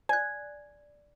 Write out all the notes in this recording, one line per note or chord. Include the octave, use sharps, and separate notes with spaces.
D5 G#5 F#6